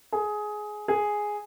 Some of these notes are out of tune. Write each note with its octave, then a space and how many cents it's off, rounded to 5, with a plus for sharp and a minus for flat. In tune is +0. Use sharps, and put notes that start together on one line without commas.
G#4 +15
G#4 +0